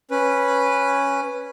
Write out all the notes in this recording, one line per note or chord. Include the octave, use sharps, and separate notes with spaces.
C#4 B4